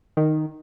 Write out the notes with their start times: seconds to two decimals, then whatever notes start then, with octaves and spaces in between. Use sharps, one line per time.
0.17 D#3